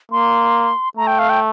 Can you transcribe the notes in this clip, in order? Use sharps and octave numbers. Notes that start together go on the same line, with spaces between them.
A#3 C6
A3 A#5
G5
F5
G5